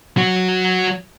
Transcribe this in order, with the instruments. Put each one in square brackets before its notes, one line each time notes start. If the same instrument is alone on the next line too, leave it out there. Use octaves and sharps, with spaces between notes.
[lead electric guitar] F#3 F#4